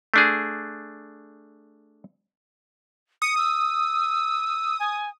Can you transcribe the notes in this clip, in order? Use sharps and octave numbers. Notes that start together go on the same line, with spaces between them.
A3 D4 G#4
D#6 C#7
E6
G#5